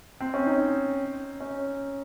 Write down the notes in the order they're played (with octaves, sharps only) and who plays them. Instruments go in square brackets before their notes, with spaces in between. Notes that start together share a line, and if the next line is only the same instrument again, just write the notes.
[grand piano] C4
C#4
D#4
C#4